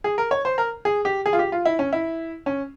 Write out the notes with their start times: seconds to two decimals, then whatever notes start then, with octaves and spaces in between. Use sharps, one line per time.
0.04 G#4
0.18 A#4
0.31 C#5
0.45 C5
0.58 A#4
0.85 G#4
1.05 G4
1.26 G#4
1.33 F4
1.39 G4
1.52 F4
1.66 E4
1.79 C#4
1.93 E4
2.46 C#4